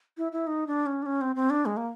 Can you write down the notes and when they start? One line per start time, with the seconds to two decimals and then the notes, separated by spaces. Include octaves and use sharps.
0.17 E4
0.32 E4
0.47 D#4
0.67 D4
0.86 C#4
1.02 D4
1.06 C#4
1.21 C4
1.36 C4
1.50 D4
1.66 G#3
1.77 A#3